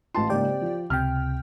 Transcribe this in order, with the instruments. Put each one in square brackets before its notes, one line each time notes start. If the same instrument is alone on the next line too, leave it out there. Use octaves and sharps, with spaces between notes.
[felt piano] A1 A5 C6 [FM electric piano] F4
[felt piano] G#2 C#3 A#3 [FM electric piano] G4 D5 G5
[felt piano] C4
F3
[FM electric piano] C#2 C3 G5 [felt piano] F6